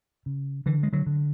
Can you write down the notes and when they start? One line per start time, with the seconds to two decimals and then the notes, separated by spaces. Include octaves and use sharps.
0.26 C#3
0.66 D3 E3
0.83 G#3
0.93 D3 F#3
1.06 D3